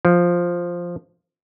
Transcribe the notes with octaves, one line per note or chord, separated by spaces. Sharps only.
F3